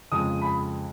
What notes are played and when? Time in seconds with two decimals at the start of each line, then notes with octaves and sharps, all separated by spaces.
0.12 F2 C#3 G#3 D#6
0.42 B5